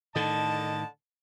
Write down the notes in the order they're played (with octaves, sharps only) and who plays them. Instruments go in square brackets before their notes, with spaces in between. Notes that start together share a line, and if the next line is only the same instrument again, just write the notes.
[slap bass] A2 D#3 [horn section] D3 D#5 A5